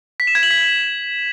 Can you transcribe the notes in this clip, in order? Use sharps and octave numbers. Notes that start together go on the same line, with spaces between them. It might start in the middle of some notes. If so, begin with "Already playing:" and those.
B6
E7
G#6
F#7
B6